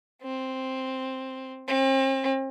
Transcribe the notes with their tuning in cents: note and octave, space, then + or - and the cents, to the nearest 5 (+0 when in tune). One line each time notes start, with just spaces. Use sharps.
C4 +5
C4 +40